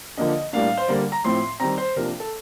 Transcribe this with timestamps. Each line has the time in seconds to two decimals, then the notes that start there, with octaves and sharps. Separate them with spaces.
0.17 D3 F3 A#3 D4 D#5
0.53 A2 G3 A#3 D4 F5
0.77 C5
0.88 D3 G3 A#3 D5
1.12 A#5
1.24 A2 F3 C4 C6
1.60 D#3 G3 C4 A#5
1.78 C5
1.96 C3 F3 A#3 D4 A#4
2.20 A4